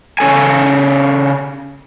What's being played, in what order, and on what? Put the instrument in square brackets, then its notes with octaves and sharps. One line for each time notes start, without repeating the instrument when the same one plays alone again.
[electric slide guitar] C#3 C#4 A4 G#5